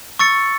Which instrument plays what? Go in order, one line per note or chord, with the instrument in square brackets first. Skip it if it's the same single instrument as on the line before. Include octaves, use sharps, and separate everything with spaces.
[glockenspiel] C#6 E6 A6 C#7